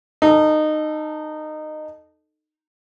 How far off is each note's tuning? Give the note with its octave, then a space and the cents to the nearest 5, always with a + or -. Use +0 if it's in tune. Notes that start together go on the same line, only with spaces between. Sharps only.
D#4 -20 A4 +0